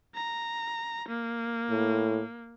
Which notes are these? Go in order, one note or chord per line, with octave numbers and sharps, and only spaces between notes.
A#5
A#3
A2